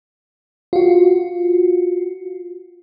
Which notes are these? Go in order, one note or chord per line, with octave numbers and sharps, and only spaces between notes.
F4 F#4